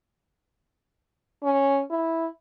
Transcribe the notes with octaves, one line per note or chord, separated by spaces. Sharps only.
C#4
E4